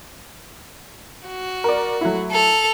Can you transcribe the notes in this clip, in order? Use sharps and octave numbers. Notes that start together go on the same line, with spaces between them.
F#4
A#4 D5
F#3 A3 E4
A4 F7